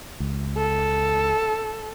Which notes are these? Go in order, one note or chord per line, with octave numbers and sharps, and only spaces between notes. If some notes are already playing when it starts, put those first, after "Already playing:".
C#2
A4